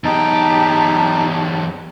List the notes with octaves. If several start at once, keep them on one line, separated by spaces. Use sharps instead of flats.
E2 D#4 G4 A5